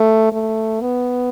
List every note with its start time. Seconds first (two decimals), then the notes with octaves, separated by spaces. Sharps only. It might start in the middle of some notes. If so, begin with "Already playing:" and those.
Already playing: A3
0.32 A3
0.81 B3